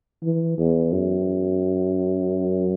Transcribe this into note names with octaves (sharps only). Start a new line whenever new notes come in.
E3
E2
F#2